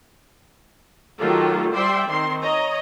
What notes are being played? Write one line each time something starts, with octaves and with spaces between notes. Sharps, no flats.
D#3 F#3 A3 F4 G4 A4
G3 C5 D5 E5 G5 C6
D#3 C4 C6
C#5 D#5 A#5